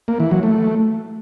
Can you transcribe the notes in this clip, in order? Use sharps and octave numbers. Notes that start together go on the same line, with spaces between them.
A#3
E3
F#3
A3